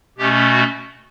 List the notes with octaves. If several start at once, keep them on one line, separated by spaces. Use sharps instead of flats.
B2 A3 C#4 G4
F#4